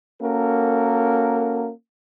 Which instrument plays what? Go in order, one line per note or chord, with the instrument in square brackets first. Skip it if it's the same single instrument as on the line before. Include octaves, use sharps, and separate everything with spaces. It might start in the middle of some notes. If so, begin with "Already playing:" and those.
[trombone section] A#3 C#4 F#4 A4 A#4